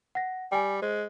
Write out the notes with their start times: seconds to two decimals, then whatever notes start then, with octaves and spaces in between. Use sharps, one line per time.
0.15 F#5 A#6
0.52 G3 G5 G#5
0.82 G#3 C5